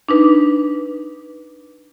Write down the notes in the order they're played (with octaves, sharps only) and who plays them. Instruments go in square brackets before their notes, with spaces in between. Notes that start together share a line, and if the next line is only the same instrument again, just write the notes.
[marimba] D4 D#4 B4